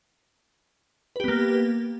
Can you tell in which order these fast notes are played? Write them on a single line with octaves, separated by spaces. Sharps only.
B4 G4 B3 A#3